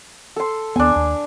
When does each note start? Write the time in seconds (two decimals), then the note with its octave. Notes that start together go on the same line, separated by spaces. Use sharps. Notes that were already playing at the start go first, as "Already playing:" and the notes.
0.36 A4 C6
0.76 D#2 B3 D4 G#5
0.96 D#2